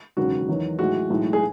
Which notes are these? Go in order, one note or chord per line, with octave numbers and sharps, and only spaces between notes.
E1 D#2 C#3 F#3 F#4
E2 D#3 F#3
B1 A2 E3 G#3 F#4
B1 A2 E3 G#3
G#4